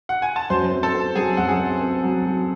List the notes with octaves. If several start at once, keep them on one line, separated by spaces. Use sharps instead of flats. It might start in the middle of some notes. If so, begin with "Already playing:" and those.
F#5
G#5
A5
F#2 C5 C6
C4
A4 A5
C4
F#3 G#4 G#5
F#2 F#5
G#4 G#5
C4
C4
F#3
F#3